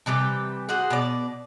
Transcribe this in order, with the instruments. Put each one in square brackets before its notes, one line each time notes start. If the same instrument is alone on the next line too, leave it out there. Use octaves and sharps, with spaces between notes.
[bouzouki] C3 E3 G3 G4
F#4 G#4 C5 F#5
B2 D5